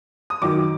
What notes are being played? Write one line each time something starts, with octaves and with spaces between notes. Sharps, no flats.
D#6
F#2 D#3 F#3 D6